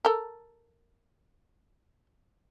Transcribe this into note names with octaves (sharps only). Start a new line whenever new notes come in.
A4 A#4